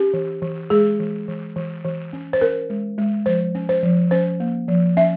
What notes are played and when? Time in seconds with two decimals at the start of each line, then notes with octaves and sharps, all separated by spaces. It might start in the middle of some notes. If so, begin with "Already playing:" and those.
Already playing: C#4 G4
0.13 E3
0.42 E3
0.70 G#3 G#4
0.99 E3
1.28 E3
1.56 E3
1.84 E3
2.13 C#4
2.33 C5
2.41 C#4 A#4
2.70 G#3
2.98 G#3
3.26 F3 C5
3.55 C#4
3.69 C5
3.83 F3
4.11 C#4 C5
4.40 A#3
4.68 F3
4.97 C#4 E5